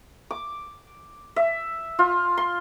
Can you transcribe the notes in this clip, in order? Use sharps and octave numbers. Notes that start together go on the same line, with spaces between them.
D6
E5
F4
C6